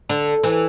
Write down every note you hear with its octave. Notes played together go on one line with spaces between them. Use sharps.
D3
E3